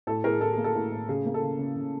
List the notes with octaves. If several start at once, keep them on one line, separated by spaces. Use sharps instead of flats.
A2 A4
A2 G#4 A#4
A2 A4
A#3 G#4
A4
A2
A2
C#3 G#4
A#3
A4
C#3
C#3
C#3